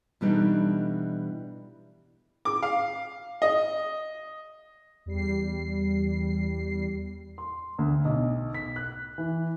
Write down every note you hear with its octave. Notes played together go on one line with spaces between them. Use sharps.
B2 E3 G3 D4 D#4 A4
D6
F5
D#5
E2 G3 C7
C6
D2
B1
B6
F#6
E3